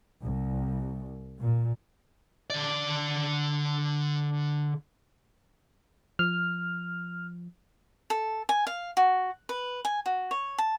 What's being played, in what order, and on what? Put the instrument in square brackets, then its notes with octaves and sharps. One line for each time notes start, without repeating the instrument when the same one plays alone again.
[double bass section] C2
A#2
[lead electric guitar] D3 D5
[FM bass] F3 [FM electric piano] F6
[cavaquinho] A4
G#5
F5
F#4
B4
G#5
F#4
C#5
A5